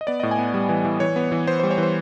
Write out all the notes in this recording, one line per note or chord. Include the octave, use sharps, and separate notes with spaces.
D#5
B3 D5
A2 D#5
G#5
B3
G3
E3
E3
E3 C#5
B3
E3
B3 C5
G3 C5
C#5
E3 C5